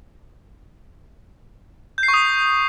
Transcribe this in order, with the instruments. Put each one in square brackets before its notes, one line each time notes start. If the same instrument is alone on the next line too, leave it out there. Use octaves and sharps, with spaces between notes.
[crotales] G6
C7
C#6
D#6